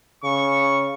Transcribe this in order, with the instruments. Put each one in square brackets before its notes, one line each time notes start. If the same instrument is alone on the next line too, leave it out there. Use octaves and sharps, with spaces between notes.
[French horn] C#3 [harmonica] C#6